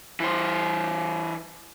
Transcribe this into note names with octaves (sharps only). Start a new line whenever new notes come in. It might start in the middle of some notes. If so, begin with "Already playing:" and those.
E3 C5